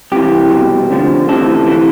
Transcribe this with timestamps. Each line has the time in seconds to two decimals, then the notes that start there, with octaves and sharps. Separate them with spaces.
0.12 C2 C3 E3 G4
0.50 C2 B2
0.90 D2 D3 F3
1.28 D2 C3 E3 A4
1.67 C3 E3